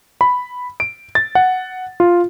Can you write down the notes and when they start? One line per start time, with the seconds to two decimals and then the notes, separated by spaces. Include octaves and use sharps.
0.21 B5
0.80 D7
1.15 A6
1.35 F#5
2.00 F4